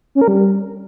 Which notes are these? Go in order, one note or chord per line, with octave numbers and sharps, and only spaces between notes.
C#4
A#4
G3